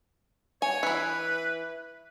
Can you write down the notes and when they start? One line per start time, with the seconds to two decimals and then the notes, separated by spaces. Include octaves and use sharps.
0.62 C#5 G#5
0.83 E3 E4 B4